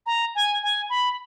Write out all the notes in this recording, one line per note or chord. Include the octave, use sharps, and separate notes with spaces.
A#5
G#5
G#5
B5